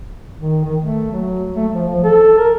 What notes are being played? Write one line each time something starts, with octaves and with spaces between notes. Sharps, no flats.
D#3
D#3
A3
F#3
A3
F3
F3
A4
A#4